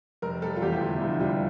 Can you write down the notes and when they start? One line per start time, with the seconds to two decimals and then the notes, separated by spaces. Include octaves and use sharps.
0.22 F1 A#4
0.42 G3 A4
0.56 F4
0.62 E2 G4
0.73 E4
0.81 D3 F4
1.01 F1 E4
1.20 G3 F4